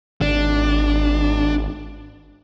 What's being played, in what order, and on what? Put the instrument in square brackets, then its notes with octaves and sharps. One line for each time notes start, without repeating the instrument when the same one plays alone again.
[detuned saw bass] G#1 [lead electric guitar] D4